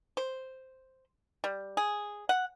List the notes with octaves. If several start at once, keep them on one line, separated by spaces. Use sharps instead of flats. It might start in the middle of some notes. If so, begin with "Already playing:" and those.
C5
G3
G#4
F#5